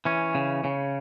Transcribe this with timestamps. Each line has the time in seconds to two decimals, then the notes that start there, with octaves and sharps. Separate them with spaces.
0.05 E3 C#4
0.35 C#3
0.64 C#3